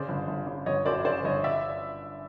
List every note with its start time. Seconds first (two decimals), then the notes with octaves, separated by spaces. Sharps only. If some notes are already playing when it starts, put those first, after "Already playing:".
Already playing: C#3 C5 D5
0.08 G1
0.27 G1
0.47 C#3
0.66 G1 C#5 D#5
0.86 F#2 C5 D5
1.05 C#3 C5 D5
1.24 G1 C#5 D#5
1.44 D5 E5